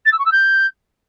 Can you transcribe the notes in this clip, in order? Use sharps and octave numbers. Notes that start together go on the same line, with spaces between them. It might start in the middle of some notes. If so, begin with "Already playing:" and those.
A6
E6
C#6
E6
G6